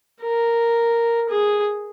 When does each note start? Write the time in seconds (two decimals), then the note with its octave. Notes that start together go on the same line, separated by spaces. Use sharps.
0.23 A#4
1.30 G#4